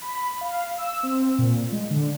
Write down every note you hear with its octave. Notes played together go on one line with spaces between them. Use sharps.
B5
F5
E6
C4
A#2
G#3
D3